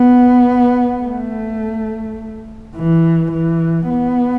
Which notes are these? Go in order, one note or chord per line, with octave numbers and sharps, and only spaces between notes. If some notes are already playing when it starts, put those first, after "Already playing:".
Already playing: B3
A3
E3
E3
B3